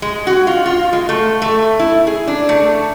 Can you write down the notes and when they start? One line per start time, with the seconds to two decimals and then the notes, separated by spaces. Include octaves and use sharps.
0.02 G#3
0.27 F#4
0.47 F4
0.66 F4
0.93 G#3
1.09 A3
1.42 A3
1.79 E4
2.07 G#4
2.27 D4
2.49 A3